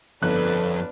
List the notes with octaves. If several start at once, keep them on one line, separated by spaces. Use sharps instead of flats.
G1 F2 D4 A4 B4 F#6